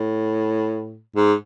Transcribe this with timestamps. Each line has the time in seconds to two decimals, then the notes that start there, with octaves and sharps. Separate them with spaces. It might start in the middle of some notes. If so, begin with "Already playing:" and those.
Already playing: A2
1.16 G#2